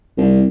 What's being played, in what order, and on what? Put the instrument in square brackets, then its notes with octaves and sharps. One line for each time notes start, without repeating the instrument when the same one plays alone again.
[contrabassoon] C2